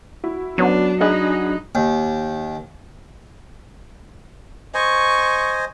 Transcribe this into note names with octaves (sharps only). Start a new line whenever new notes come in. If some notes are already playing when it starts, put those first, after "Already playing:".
E4 F#4
F#3 B3 C#4 D4
D4 D#4 F#4 G#4 D#5 B5 F#6
D#2
C5 D#5 G#5 C#6